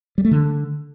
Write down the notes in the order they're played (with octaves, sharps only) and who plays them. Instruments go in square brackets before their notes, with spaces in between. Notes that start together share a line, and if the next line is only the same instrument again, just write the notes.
[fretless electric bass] G3
A3
D3